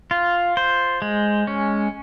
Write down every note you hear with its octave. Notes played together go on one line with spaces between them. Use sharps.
F4
C5
G#3
C#4